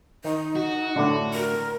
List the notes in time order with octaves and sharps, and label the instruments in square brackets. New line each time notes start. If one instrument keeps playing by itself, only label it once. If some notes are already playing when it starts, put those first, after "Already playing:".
[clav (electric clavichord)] D#3 [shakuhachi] D#4
[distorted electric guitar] F#4
[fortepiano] A2 D3 [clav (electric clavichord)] D4 E4 D5
[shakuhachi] A#4